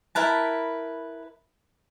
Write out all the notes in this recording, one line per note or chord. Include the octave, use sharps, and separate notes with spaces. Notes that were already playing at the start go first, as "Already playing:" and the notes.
E4 A#4 B4 A5